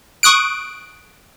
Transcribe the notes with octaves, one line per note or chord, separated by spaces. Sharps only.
C#6 D#6 F#6 D7